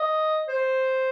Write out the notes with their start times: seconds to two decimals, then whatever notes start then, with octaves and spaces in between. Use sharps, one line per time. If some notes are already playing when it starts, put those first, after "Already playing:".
Already playing: D#5
0.49 C5